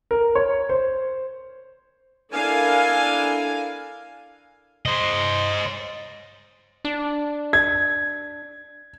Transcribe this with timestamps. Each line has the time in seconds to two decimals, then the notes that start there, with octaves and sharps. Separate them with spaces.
0.11 A#4
0.35 C#5
0.69 C5
2.33 D4 E4 A4 A#4 F5 G#5
4.86 C5 D#5
6.85 D4
7.53 G#6